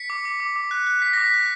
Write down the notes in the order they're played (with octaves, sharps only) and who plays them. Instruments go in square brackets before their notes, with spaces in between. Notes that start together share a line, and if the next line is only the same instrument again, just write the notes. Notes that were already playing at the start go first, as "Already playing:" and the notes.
Already playing: [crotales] B6 C#7
D6
D6
D6
D6
F#6
F#6
F#6 B6
D6 A#6
B6
F#6